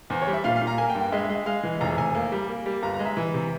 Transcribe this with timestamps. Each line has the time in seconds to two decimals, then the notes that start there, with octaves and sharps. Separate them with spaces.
0.10 E2 C5
0.22 C#5
0.27 G3
0.33 E5
0.44 A#2 F5
0.56 F5
0.61 A#2
0.67 A#5
0.78 A#3 G#5
0.90 G5
0.95 G2
1.01 G5
1.12 G#3 E5
1.23 E5
1.29 G#3
1.35 E5
1.46 G#3 F5
1.63 E3
1.81 F1 A#5
1.97 F1 G#5
2.15 A#3
2.32 G3
2.48 A#3
2.66 G3
2.83 G1 A#5
2.94 A#5
2.99 G#3
3.05 E5
3.17 E3
3.34 C3